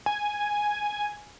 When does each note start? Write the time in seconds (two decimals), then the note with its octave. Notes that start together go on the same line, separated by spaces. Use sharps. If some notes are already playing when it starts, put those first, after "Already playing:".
0.06 G#5